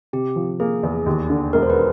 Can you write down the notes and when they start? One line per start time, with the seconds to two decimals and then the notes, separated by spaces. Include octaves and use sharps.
0.13 C3 G4
0.36 F3
0.60 A#3 G#4
0.83 E2
1.06 D#2
1.30 D3
1.53 E1 A#4
1.62 C5
1.70 B4